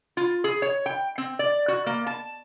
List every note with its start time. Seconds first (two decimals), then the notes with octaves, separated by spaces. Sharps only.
0.17 F4
0.44 G#4
0.62 C#5
0.86 G5
1.18 C4
1.39 D5
1.68 F#4
1.86 A#3
2.06 A5